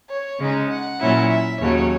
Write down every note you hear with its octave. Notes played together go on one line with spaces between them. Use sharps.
C#5
C#3 G#3 D#4
F#5
A#2 F#3 C#4 E4
E5
D#2 C#3 F#3 C#5